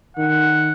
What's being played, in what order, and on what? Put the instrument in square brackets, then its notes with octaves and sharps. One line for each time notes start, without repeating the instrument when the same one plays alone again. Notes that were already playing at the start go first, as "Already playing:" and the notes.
[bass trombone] D#3 [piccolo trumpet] F#5